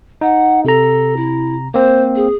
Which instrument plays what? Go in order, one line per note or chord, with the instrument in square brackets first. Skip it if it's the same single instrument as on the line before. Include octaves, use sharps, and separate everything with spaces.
[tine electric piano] D#4 [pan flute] F#5
[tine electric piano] C3 A#5 [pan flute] A4
[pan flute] E4
[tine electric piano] A#3 C4 [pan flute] C5
[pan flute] G#4